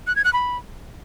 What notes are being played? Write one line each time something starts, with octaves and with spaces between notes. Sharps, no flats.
F#6
G#6
F#6
B5